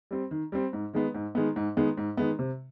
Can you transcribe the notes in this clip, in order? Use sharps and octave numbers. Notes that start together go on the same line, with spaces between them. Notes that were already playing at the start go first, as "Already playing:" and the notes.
G3 C4
D#3
G3 C4
G#2
D#3 G#3 B3
G#2
D#3 G#3 B3
G#2
D#3 G#3 B3
G#2
D#3 G#3 B3
C3